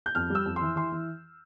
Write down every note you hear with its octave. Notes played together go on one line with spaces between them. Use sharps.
G6
F2 F6
G3
E6
F2
C6
E3
E3 C6
E3